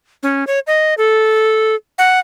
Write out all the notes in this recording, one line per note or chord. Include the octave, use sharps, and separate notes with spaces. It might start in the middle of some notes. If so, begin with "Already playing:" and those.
C#4
C#5
D#5
A4
F#5